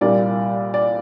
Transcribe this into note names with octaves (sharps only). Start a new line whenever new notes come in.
C2 A#2 G3 A#3 D5
D5